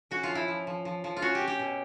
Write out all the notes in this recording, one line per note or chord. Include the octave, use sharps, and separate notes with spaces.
C#4 F#4
F4
F3
E4
F3
F3
F3
F3
F4
C#4 F#4
G4
C#4
G4
B2